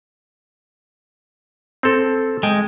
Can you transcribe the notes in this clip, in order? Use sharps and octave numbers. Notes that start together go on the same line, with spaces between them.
C4 A4
G#3 G5